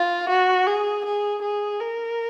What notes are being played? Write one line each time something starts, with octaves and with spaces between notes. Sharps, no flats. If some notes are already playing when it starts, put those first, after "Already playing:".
Already playing: F4
F#4
G#4
G#4
G#4
A#4